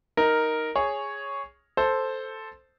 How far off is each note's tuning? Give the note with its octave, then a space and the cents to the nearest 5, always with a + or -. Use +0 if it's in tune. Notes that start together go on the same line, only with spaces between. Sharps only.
D#4 +10 A#4 +0
G#4 +0 C#5 +0
A4 +0 C5 +0